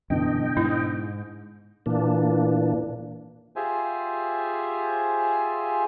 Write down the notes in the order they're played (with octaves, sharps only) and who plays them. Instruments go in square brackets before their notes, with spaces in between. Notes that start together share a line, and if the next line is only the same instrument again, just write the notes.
[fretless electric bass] F#2 E3 [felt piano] B2 D3 D4 [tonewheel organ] D#5 G5
[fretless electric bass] G#2 [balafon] E4
[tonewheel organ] A#2 E3 A#3 D4
[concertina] F4 G4 G#4 C5 E5 G#5